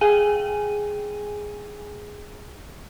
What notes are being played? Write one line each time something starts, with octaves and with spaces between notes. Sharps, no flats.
G#4 G5 G#5 D#7